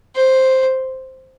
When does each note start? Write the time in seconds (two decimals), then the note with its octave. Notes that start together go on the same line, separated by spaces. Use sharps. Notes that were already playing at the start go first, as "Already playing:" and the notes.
0.16 C5